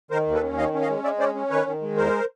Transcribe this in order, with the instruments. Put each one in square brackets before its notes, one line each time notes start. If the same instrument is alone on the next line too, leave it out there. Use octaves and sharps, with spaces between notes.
[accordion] D#3 A#4 C5
D#2
A4 B4
C#4
D#3 D#5 F5
C#4
D#5 F5
G#3
G#3 D5 E5
C#4 C5 D5
C#4
D#3 B4 C#5
D#3
G#3
E2 A#4 C5